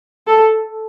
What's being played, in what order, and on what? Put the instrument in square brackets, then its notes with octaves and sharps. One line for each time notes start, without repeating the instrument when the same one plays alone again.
[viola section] A4